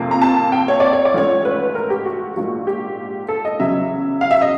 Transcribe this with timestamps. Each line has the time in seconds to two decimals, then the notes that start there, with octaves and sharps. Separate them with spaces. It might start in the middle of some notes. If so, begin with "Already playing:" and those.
Already playing: F2 C3 F3 A#3
0.11 A#5
0.22 A5
0.52 G5
0.68 C#5
0.80 D5
0.93 C#5
1.05 D5
1.14 A1 G#2 F3 A3 C#5
1.45 B4
1.75 A#4
1.90 G4
2.06 F#4
2.36 A#1 G#2 F3 A#3 F#4
2.67 G4
3.28 A4
3.45 D#5
3.59 E2 C#3 F#3 E5
4.21 F5
4.31 E5
4.42 D#5